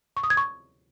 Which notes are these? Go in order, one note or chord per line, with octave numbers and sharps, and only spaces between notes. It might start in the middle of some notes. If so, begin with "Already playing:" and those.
C#6
D#6
G#6
C#6